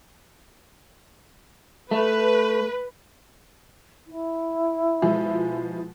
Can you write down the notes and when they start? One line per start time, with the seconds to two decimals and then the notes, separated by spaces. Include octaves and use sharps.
1.91 A3 B4
4.07 E4
5.02 B2 F3 G#3